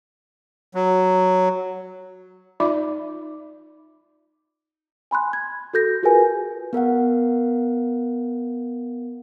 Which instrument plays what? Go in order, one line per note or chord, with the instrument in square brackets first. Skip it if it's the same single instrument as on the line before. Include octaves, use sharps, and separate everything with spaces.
[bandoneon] F#3
[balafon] D#4 F4 D5 E5 B5 D6
[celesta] G#5 B5 C6 F#6
G#6
F#4 A4 G6 A#6
F4 F#4 G#4 A#4 B4 G#5
[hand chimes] B3 A#4 F5 F#5